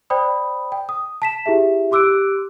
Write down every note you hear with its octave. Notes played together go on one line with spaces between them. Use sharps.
C5 D5 G5 B5 D#6
G5
D#6
A5 B6 E7
E4 G4 G#4 E5
G4 C6 D6 E6 F#6 D7